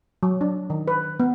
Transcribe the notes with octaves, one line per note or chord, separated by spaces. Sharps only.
F#3
D4
D#3
B4
B3